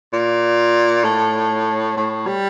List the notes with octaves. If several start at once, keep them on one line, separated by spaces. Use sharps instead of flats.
A#2
A2
A2
G3